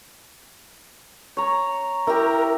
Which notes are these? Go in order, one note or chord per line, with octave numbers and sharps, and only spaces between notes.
C#5 A#5
E4 G4 A#4